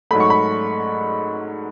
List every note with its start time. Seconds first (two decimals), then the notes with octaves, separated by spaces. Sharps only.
0.11 G#2 F#3 A3 B5
0.20 C#6
0.30 B5